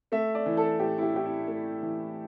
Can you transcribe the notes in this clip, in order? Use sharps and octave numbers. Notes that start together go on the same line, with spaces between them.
A3 E5
D5
E3
A4
A2 G4
E4
G4
A2 G4
E4
A3
E3